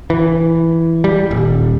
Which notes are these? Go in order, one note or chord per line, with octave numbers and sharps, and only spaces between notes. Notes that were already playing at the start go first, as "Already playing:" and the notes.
E3
G3
D#1